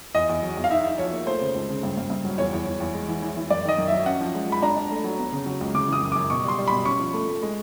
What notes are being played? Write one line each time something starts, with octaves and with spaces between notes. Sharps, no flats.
E2 D#5
E2
F#3
E2
F5
D#4 E5
D#4
F3 C#5
A#3
A3 C5
C#3
C#2
C#3
G2
G2
G2
F#3
E2 C#5
E2
E2
E2
G#3
E3
E3
E3
F#2 D5
D#3 D#5
F#2
F#3 E5
C#4 F#5
F3
G#3
G#3 B5
D4 A#5
D4
A3
F#3
B3
C#3
F#3
C#2
C#3 D6
E3 D#6
F#2
F#2 D6
B2 C#6
G3 C6
G3
B2 B5
C#4 C#6
F3
A3
A3
G#3